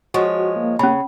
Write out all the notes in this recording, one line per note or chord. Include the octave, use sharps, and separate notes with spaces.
F3 G#3 F#4 C#5
A#3
C#3 C#4 B5